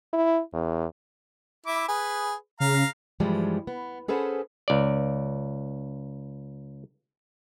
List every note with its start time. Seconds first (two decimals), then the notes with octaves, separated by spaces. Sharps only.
0.13 E4
0.54 E2
1.66 E4 E5 D6
1.88 G#4 B4
2.60 C#3 F5 A#5
3.20 G2 E3 F3 G3 G#3
3.67 B3
4.08 C#4 G#4 A4 B4 C5 F#5
4.68 C#2 D5